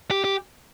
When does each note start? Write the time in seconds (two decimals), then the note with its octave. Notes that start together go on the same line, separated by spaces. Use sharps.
0.11 G4
0.24 G4